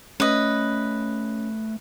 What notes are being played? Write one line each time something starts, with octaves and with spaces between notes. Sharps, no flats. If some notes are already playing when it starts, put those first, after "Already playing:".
A3 C#4 B4 D#5